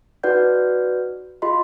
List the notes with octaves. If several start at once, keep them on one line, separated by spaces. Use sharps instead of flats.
D#4 F#4 B4 D5 F#5 G6
F4 G#4 D#5 B5 C6